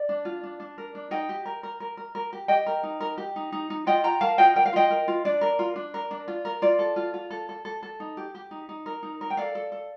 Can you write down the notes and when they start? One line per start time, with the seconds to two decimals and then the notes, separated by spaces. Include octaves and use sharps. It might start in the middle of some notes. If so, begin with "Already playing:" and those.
Already playing: D5
0.09 D4
0.25 F4
0.43 D4
0.60 D4
0.78 A#4
0.95 D4
1.11 D#4 D#5 G5
1.29 G4
1.45 A#4
1.63 A#4
1.80 A#4
1.97 A#4
2.15 A#4
2.33 G4
2.48 G4 D#5 G5
2.66 A#4
2.83 D#4
3.01 A#4
3.18 G4
3.36 D#4
3.52 D#4
3.70 D#4
3.86 F4 D#5 G5
4.04 F4 G5 A#5
4.21 A#4 F5 A5
4.38 F4 D#5 G5
4.56 A#4 G5
4.66 F5
4.73 F4 D#5 G5
4.90 A#4
5.08 F4
5.25 D4 D5
5.41 A#4
5.59 F4
5.76 D4
5.94 A#4
6.11 D4
6.28 F4
6.45 A#4
6.62 F4 D5
6.79 A4
6.96 F4
7.14 F4
7.30 A4
7.49 A4
7.65 A4
7.83 A4
8.00 D#4
8.17 G4
8.35 G4
8.51 D#4
8.69 D#4
8.86 A#4
9.03 D#4
9.21 A#4
9.30 G5
9.37 A4 D5 F5
9.55 A4
9.72 A4